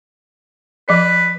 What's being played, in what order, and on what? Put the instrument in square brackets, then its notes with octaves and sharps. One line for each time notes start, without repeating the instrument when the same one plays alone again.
[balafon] F3 D5 [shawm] B4